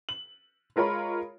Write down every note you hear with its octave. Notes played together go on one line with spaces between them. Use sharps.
F#7
G#3 F4 A#4 C#5 B5